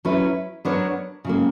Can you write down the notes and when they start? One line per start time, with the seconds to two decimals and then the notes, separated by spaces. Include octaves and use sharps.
0.05 F#3 C#4 E4 B4
0.65 F#3 B3 D4 A#4 C#5
1.25 C#3 F#3 A#3